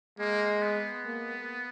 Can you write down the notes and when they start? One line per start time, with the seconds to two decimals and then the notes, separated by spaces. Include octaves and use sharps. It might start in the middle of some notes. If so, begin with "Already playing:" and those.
0.19 G#3 A#3
0.62 B3
1.06 A#3